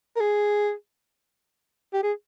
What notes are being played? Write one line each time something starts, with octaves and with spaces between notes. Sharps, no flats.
A#4
G#4
G4
G#4